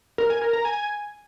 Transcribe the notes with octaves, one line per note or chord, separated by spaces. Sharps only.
A#4
G#5
A#4
A#5
G#5